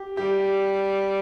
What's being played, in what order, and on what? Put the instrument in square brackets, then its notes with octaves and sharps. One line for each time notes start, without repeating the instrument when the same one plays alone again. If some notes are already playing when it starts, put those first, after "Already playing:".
Already playing: [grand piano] G4
[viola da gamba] G3 [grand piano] G4